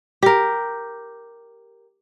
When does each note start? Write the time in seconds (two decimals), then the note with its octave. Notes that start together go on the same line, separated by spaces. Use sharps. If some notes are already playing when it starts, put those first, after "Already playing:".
0.23 G4 A#4